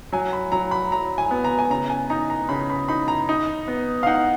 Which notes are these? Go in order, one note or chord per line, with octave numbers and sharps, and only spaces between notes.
F#3 G#5
B5
F#3 A#5
B5
F#3 A#5
G#5
B3
A#5
G#5
C#3 A#5
G#5
D#4 A#5
A#5
C#3 B5
B5
D#4 B5
A#5
D#4
B3
F5
D#4 F#5